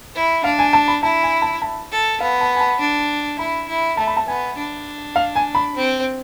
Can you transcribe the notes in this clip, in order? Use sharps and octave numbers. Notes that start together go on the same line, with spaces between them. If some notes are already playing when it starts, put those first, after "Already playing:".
E4
D4 F5
G#5
A5
B5
E4 A5
G#5
A5
A5
A4
B3 F5
A5
G#5
A5
D4
E4 B5
E4
A3 A5
B5
A5
B3 G#5
D4
F5
G#5
B5
C4